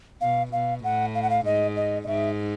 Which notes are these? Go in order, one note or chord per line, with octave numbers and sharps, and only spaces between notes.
B2 F5
B2 F5
A2 F#5
F5
F#5
F5
G#2 D#5
D#5
D#5
G#2 E5